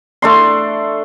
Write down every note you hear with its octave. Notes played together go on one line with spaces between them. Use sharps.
A3 D4 C6